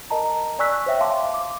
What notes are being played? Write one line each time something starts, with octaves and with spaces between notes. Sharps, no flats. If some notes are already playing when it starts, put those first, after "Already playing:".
A#4 D#5 A5 A#5
D5 G#5 C#6 E6 F#6 B6
C5 C#5 E5 G5
E5 F5 A5 C6 D6
D6